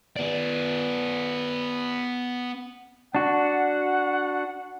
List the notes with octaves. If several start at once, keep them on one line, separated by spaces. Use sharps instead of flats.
B3 D5
D4 F#4 F#5